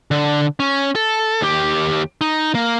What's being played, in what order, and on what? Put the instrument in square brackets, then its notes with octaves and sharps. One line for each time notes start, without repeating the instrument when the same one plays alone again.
[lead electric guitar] D3
C#4
A4
D#2 G4
D#4
A#3